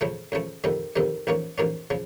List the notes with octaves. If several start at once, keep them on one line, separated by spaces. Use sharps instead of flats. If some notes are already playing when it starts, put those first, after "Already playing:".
C#2 C#3 F3 A3
C#2 C#3 F3 A3
F2 C3 D#3 G3
F2 C3 D#3 G3
A1 G#2 F3 A#3 C#4
A1 G#2 F3 A#3 C#4
C#3 F3